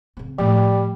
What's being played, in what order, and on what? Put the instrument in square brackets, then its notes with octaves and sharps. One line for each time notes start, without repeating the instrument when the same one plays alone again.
[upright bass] C#3 C4
[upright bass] A2 [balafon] F3 A3 [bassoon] G3